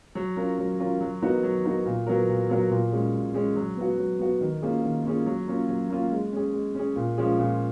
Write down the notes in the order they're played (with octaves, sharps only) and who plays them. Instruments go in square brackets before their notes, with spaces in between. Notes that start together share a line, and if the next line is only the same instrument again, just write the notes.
[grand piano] F#3
C#4 F4 A#4
F#3
C#4 F4 A#4
F#3
B3 D#4 F#4 A#4
F#3
B3 D#4 F#4 A#4
A#2
F#3 B3 F#4 A#4
A#2
F#3 B3 F#4 A#4
A#2
G#3 C#4 G#4
A#2
G#3 C#4 G#4
F#3
B3 F#4
F#3
B3 F#4
D#3
A#3 C#4 F4 G#4
D#3
A#3 C#4 F4 G#4
F#3
A#3 C#4 F4
F#3
A#3 C#4 F4
G#3
C#4 G#4
G#3
C#4 G#4
A#2
F3 G#3 C#4 G#4
A#2